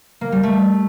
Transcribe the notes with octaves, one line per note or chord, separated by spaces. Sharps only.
A#3
G3
A3